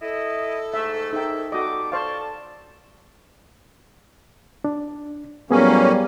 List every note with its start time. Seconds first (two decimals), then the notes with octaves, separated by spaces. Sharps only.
0.02 E4 A4 D#5
0.74 G#2 A3 E5
1.13 D#2 G#2 D#4 E5 G5
1.52 G3 A3 F#4 D#5 D6
1.92 A4 C5 D5 F5 A5 C#6
4.64 D4
5.51 A2 F#3 G3 A#3 B3 C#4 G#4